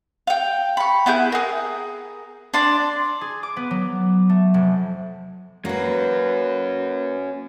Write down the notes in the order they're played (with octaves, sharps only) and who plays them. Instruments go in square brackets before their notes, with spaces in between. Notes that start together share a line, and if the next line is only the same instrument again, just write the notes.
[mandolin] F5 G5
B5 C#6
B3 E4 G#4 G6
G#4 A#4
D4 D5 C6
[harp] G#4
D6
B3
F#3
A3
F1
[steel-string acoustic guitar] A#3 B4 [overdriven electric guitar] C#4 F#4